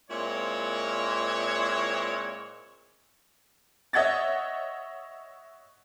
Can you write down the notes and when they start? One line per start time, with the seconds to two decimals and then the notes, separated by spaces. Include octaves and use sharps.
0.11 A#2 G#3 C4 E4 C#5
3.93 C#5 D#5 E5 F#5 G#6 A6